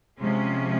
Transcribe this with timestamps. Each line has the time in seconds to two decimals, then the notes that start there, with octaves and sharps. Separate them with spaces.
0.19 C3 F3 G#3 C#4